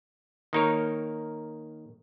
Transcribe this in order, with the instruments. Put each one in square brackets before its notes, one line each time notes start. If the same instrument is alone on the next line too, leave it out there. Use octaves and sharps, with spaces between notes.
[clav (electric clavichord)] D#3 A#3 D#4 A#4 C#5